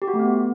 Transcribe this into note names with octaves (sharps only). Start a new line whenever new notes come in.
G4
F#4
A3
B3